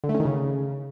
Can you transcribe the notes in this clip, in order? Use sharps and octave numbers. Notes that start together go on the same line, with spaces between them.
D3
A3
C#4
D#3
C#3